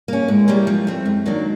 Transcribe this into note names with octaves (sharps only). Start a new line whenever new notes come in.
A#3 C#4
A2 G#3
E3 G3 A#3 C#4
F3
A3 C4
G3
F#2 G#3
D#3 F#3 A#3 D4